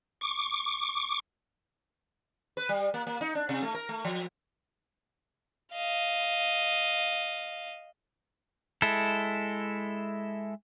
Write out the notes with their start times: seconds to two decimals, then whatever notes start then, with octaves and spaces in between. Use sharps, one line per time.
0.21 C#6 D6
2.57 B4
2.69 G3
2.94 A#3
3.07 A#3
3.21 D#4
3.35 D4
3.49 C3
3.63 A3
3.74 A#4
3.89 A3
4.05 F3
5.73 D#5 F5
8.82 G#3 E4 A4